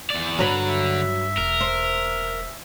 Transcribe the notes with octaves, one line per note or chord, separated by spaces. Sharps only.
E2 D5
G2 D3 F#3 B4
E5
E1 A#4
C5